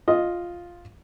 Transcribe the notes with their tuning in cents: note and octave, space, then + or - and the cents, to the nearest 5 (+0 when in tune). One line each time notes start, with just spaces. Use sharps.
F4 +0 D#5 +0